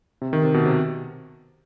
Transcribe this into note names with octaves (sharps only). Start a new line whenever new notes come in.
C3
D#3
C3
B2
C3